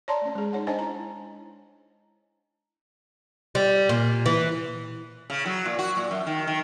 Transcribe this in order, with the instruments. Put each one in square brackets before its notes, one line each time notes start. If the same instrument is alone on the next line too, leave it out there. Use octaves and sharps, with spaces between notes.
[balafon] C#5 D5 A5 A#5 C6
A3 C#4
G#3 G#4
D#4 C#5 F#5
D4 C5 C#5 D#5 G#5 A5
E4 A#5
[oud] G3
A#2
E3
[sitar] C#3
F#3
A#2
F#4
A#2
F#2
D#3
D#3